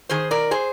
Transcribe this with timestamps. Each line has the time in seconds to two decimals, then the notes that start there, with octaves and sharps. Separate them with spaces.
0.09 D#3 G#4 C5
0.31 A#4 D5
0.51 G#4 C5